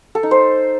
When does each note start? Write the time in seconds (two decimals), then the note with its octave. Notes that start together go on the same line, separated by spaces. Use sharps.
0.15 A4
0.23 D#4
0.31 C5